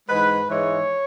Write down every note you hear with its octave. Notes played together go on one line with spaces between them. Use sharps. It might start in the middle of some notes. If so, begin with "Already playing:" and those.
G#2 E3 G#3 B4
G#2 E3 G#3 C#5